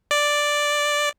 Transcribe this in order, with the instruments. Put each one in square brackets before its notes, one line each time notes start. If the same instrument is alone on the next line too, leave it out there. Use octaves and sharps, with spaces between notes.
[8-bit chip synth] D5